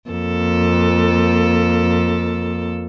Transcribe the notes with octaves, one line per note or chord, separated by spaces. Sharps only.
F2 A#3 A4